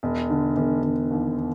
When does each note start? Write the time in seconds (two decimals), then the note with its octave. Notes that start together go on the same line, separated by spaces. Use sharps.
0.03 E1
0.30 D3
0.57 E1
0.83 E1
1.10 D#2